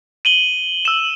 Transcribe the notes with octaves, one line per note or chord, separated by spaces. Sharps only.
D#7 F#7 G7
E6 E7